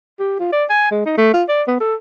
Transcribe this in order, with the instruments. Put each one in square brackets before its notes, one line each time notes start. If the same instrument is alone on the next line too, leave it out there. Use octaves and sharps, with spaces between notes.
[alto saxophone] G4
F4
D5
G#5
G#3
D#4
A3
F4
D5
B3
A4